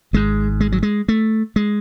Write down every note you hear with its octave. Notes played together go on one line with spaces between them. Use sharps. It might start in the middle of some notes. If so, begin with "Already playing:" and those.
G#1 G#2 G#3
G#3
F#3
G#3
A3
G#3